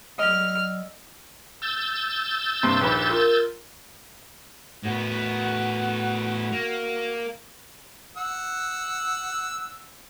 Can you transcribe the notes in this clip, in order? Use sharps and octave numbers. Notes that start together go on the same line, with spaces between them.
F#3 D5 D#5 E6 F6
E6 G6 A6
G2 C3 A#3 C6
A#1 D#2 B4 B5
F4 A#4
A2 B3 F#4
A#3
F#5 E6